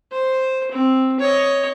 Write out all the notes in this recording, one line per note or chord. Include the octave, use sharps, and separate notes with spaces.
C5
C4
C#5 D#5